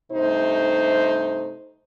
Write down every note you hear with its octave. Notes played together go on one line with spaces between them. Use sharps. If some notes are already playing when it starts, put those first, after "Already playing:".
G2 C3 A3 D#4 C5